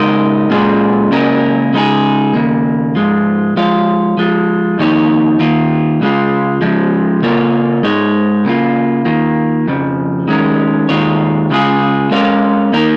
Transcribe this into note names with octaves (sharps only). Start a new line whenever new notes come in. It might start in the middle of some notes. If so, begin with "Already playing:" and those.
Already playing: C#3 G#3 D#4 A#4 D#5
A#2 G#3 C#4 F4 G#4
C#2 C#3 A#3 C#4 A#4
C#3 G#3 D#4 G#4
D#2 C#3 A#3
G#2 F3 G#3 F4
F3 G#3 F4 C#5 F5
F3 G#3 F4
F2 D#3 A#3 D#4 C#5
D#3 A#3 F4
C#2 C#3 G#3 F4
C#2 C#3 F3 G#3
C#3 A#3 F4 A#4 C#5
G#2 G#3 D#4 C#5
C#3 A#3 F4
D#3 A#3 F4
F2 C#3 F3
D#3 G#3 C#4 A#4
D#2 D#3 G#3 F4 C#5
C#3 G#3 F4 G#4
G#3 C#4 A#4 C#5 F5
D#3 A#3 D#4 A#4